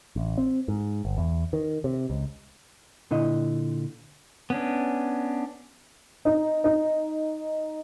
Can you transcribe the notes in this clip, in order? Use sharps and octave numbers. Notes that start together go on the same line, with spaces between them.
A1
C4
G#2
G1
E2
D#3
C3
C#2
A#2 D3 E4 D#5
B3 C#4 D4
D#4
D#4